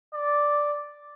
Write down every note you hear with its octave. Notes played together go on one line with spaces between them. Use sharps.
D5